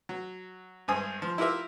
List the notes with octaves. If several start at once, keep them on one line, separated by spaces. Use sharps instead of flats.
F#3
G#1 G2 C5 G#5 D#6
F3
E4 F4 G4 A#4 E5